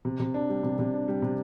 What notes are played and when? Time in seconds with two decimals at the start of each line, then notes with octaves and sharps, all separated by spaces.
0.05 C3
0.20 C3
0.34 D4
0.49 G3
0.63 C3
0.79 C3
0.94 D4
1.08 G3
1.22 C3